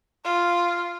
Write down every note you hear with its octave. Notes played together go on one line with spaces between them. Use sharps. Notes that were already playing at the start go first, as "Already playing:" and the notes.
F4